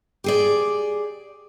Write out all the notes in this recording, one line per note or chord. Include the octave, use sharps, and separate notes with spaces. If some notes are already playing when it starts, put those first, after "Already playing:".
G4 G#4 D5